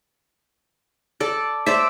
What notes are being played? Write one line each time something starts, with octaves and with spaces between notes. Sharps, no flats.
A4 D5
C5 D5 E5